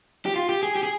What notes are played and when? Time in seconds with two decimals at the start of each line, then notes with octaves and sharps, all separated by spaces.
0.26 G4
0.36 F4
0.49 G4
0.63 G#4
0.75 G4
0.83 G#4